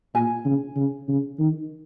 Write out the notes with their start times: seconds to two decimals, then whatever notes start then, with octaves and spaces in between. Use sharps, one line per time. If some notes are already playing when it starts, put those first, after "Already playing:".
0.14 A#2 G#5
0.45 C#3
0.76 C#3
1.08 C#3
1.39 D#3